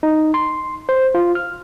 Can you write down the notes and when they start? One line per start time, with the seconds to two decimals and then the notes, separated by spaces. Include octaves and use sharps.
0.03 D#4
0.34 C6
0.89 C5
1.15 F4
1.35 F6